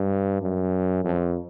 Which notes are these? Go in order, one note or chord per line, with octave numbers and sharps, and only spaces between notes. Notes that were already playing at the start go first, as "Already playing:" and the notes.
Already playing: G2
F#2
F2